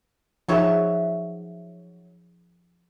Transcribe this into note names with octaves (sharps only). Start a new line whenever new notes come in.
F3 F#3 D#4 G#4 C#5 E5